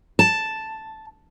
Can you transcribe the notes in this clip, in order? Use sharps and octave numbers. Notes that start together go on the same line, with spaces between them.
A5